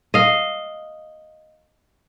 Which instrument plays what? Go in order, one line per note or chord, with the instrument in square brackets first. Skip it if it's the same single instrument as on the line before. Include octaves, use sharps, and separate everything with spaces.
[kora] D#5 F5